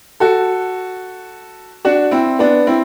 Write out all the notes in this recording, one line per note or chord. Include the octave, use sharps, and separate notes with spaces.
F#4 A4
D4 F#4
C4 E4
B3 D4
C4 E4